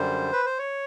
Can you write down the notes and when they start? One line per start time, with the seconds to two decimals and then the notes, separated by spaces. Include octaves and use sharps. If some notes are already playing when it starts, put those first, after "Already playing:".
Already playing: F#2 D3 G3 C5
0.33 B4
0.45 C5
0.58 C#5